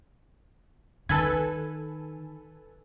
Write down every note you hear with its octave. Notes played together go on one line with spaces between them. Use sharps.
D#3 A4 B4 G#5